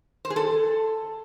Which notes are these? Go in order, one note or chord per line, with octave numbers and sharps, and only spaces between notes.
C5
G#4
A4